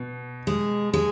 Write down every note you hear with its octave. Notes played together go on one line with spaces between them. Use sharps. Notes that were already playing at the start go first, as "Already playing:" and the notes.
Already playing: B2
G#3
G#3